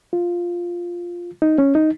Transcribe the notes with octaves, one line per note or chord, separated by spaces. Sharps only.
F4
D#4
C#4
D#4